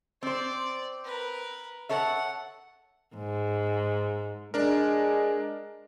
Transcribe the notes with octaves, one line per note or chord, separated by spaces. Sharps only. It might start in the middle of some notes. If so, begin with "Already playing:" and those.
C4 C5 D5
A#4 B4
A4 C#5 E5 F#5
G#2
G#3 D4 A#4